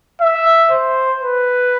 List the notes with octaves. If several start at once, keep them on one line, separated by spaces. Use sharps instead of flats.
E5
C5
B4